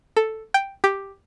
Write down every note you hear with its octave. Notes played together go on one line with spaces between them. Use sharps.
A4
G5
G4